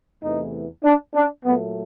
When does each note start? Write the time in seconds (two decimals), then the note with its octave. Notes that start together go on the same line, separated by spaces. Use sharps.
0.23 E2 C3 E3 A3 D#4
0.84 D4
1.15 D4
1.44 A#2 F#3 A3 B3